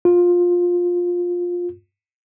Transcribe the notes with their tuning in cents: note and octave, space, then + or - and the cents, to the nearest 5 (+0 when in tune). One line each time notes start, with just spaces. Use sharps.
F4 +15